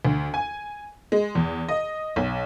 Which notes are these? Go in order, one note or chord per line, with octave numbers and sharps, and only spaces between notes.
D2
G#5
G#3
E2
D#5
B1